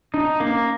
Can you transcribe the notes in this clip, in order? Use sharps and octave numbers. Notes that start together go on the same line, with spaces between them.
D4 D#4
A#3 C#4